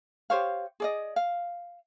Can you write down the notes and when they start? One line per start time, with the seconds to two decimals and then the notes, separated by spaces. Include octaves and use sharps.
0.30 G4 C5 C#5 F5
0.80 G#4 D5 D#5
1.16 F5